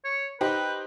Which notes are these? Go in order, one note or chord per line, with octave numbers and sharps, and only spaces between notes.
C#5
D#4 G4 B4 C5